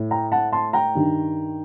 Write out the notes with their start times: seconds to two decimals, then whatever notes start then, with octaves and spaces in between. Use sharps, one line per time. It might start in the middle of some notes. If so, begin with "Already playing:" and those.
Already playing: A2
0.11 G5 A#5
0.32 F#5 A5
0.52 A5 C6
0.73 G5 A#5
0.95 G2 D#3